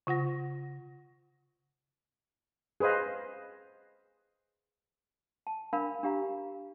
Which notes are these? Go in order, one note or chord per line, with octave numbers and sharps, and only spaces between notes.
C#3 F4 F#5 A#6
G#4 B4 C5 D#5 F5
A5
D4 A#4 F5 B5
D4 G4 F5 A#5